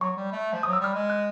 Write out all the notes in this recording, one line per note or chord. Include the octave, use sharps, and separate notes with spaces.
F#3 C#6
G3
A3
F3
F#3 D#6
E6
G3 F6
G#3
F#6